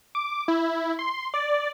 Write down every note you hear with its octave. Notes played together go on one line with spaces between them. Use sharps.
D6
E4
C6
D5